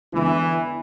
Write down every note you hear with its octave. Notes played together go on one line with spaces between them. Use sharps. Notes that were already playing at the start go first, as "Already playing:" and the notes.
D3 E3 G#3 B3 D4